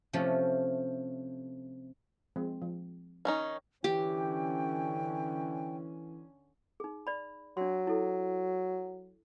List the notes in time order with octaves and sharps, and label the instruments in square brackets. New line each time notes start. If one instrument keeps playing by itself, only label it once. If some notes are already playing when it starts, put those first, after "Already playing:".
[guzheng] C3 F3 A3 C#4
[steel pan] F3 G#3 C4
F3
[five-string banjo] D#3 C#4 D#4 [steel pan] C#5
[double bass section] D3 C#4 [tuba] E3 [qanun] G4 [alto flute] G5
[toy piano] D#4 G#4
D5 B5
[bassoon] F#3 [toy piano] D4 C6
[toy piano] E4 A4